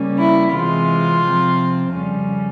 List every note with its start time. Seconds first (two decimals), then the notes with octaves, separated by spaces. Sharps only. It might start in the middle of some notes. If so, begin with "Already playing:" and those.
Already playing: C#3 G3 A#3 C#4
0.17 E4
0.52 C3 E3 G#3 C4 F4
1.23 C3 F3 C4
1.93 F2 C#3 G3 C#4